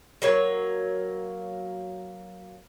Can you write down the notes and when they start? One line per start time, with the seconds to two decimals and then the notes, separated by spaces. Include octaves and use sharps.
0.22 F#3 A#3 C#5